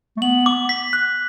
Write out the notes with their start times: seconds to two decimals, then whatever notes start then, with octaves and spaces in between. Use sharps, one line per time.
0.17 A3
0.22 B3 F#7
0.46 D6
0.69 B6
0.93 F#6